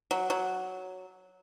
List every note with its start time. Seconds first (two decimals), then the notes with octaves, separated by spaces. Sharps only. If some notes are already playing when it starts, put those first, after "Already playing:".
0.11 F#3
0.30 F#3